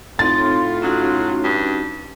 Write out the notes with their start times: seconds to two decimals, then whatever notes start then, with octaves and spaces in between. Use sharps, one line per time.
0.19 A2 C4 D#4 F4 C6 A6
0.82 F#3 C#4 D#4 F#4
1.44 G2